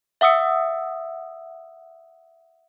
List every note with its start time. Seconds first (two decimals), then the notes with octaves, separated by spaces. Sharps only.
0.21 E5 F#5 D#6 E6 C#7